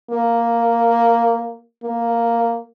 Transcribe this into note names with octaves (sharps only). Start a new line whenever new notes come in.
A#3
A#3